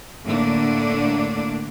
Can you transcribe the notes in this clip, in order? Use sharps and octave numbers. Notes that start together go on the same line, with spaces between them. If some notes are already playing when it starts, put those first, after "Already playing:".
A2 D3 A3 A#3 D4